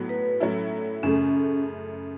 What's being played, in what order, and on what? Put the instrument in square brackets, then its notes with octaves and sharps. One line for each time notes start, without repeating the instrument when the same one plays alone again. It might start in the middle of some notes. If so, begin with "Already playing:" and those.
Already playing: [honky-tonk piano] A2 F#3 B3 F#4
[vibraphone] B4
[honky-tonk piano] A2 F#3 C#4 E4 [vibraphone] A4
[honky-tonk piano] F#2 C#3 A3 [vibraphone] C#4